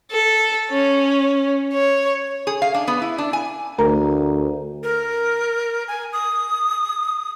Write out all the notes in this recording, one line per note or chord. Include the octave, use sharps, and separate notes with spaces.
A4
C#4
C#5
G#4
F5
D4
B3
E4
D4
G#5
D2 A3 A#4 A#5
A#4
G#5
D#6